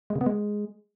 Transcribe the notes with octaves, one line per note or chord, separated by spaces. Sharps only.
G#3
C#3
B3
G#3